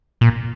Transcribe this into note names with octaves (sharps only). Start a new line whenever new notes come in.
A#2